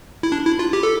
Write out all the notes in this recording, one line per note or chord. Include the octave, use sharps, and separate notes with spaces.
E4
D4
E4
F4
G4
A4